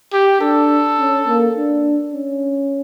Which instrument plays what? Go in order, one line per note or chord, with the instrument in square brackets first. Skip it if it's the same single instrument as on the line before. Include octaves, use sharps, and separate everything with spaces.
[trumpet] G4
[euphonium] D4 [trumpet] A4
[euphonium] C#4
A#3
D4
C#4